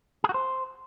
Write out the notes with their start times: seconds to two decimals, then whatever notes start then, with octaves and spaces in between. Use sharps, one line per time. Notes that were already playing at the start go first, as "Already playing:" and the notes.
0.24 G#4
0.29 F#4
0.34 C5